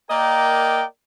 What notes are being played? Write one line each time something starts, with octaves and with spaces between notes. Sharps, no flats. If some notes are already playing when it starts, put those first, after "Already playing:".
A#3 A#4 D5 D#5 G5